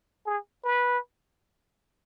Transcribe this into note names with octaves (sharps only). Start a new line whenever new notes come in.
G#4
B4